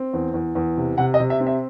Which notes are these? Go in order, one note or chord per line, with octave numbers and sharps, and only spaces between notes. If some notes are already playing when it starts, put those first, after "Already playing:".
Already playing: C4
E2
E2
E2
C3
C3 F#5
D#5
C3
E5
C4
E5